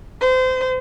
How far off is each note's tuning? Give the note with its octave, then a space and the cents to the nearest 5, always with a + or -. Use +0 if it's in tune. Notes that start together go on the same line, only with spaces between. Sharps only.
C5 -30